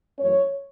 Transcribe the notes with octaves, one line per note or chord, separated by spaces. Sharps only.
F#2 E3 A3 C#4 C#5